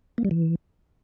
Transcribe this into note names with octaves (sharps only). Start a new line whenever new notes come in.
A#3
G3
E3